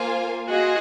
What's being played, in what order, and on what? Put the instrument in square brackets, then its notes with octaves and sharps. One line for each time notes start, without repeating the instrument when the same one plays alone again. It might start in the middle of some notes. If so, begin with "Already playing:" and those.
Already playing: [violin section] A#3 F4 C5 F5 G#5
[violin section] F4 G#4 D#5 [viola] F#4